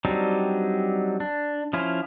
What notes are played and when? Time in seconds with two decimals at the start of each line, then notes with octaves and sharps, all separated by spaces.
0.05 F#3 G3 C4 D4 D#4
1.20 D4
1.73 F3 C#4 E4 F4